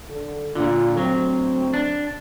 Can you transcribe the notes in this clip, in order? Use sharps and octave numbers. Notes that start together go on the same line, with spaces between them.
D3 A4
A#2 D3 D4 F4
D3 F#3 A3 C4
D4